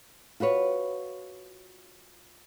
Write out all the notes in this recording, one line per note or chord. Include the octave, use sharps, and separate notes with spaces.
F4 F#4 B4 C#5